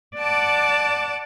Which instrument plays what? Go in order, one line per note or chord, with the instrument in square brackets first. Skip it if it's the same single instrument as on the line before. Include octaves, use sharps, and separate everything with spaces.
[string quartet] D5 F#5 A5 D6